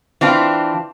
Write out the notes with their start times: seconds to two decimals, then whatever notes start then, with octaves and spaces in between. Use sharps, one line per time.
0.21 E3 C4 D4 F4